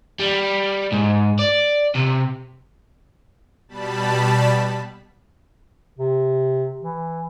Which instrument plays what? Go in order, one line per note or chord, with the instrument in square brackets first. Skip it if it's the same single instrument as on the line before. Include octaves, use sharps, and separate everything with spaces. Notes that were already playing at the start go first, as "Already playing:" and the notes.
[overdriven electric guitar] G3
G#2
D5
C3
[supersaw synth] B2 G3 A5 B5
[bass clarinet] C3
E3